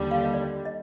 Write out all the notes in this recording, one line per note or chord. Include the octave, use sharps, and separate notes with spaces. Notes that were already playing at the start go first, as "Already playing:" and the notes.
Already playing: D#2 D3 G3
F5
D#5
D5
D#5